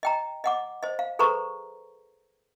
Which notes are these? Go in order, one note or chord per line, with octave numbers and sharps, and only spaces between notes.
D#5 G5 A#5
D#5 F#5 D6
C5 D#5
F5
G#4 A4 B4 C5 A#5 C#6